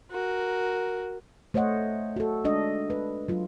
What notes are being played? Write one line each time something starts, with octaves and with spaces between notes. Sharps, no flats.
F#4 A#4
A3 C5 C#5 D#5 F#5
F#4 A4
G#3 D4 D#5
B4
F#3 F4